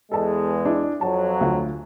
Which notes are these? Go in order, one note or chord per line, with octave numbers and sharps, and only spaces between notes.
E2 G#3 A4 A5
D4 E4
F2 F#3 A5
D2 F4